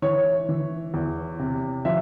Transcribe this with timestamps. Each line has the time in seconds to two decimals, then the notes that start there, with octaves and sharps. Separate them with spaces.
0.02 E3 C#5
0.49 E3
0.94 E2
1.39 C3
1.85 F3 E5